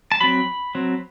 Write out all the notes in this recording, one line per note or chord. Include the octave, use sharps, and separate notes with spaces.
A5
F#3 C4 B5
F#3 C4